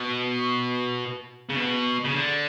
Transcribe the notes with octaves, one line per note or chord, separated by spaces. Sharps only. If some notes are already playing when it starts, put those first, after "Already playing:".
Already playing: B2
C#3
B2
C#3
D3